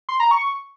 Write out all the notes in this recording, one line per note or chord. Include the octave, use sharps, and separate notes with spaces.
C6
A#5
C#6